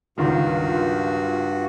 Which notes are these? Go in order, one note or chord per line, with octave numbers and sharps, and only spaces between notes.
C#2 G2 D#3 F4 F#4